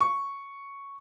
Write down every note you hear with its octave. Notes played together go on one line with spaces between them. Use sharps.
C#6